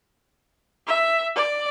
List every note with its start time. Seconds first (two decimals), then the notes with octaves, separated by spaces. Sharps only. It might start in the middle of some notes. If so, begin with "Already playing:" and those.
0.87 E5
1.36 D5